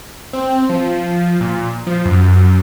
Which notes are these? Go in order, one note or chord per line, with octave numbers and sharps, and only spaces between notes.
C4
F3
A#2
F3
F#2